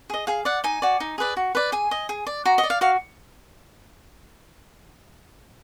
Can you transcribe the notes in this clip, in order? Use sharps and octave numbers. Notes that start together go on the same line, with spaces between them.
G#4 D#5
G#4 F5
D5 F#5
D#4 G#5
F#4 D5
D#4
G#4 B4 D5
F#4
B4 D5
G#4 G#5
D#5
G#4
D5
F#4 A#5
D#5
D5
F5
F#4 F5